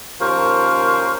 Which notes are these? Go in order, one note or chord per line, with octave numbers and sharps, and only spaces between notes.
D#2 F3 C#4 A#4 C5 C#6